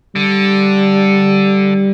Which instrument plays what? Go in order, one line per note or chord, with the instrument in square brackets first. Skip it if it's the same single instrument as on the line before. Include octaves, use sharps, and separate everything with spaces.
[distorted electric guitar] D3 [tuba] G3